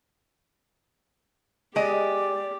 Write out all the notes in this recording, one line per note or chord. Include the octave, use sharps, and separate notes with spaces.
G#3 G4 D5 D#5